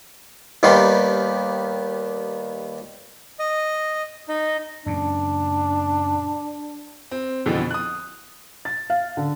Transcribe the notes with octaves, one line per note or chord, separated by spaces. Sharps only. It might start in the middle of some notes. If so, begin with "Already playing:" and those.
D#2 D#3 G3 B3 C6
D#5
D#4
F#2 A#2 C#3 D4
C4
F2 B2 D3 E3
D#6 F#6
A6
F5
D3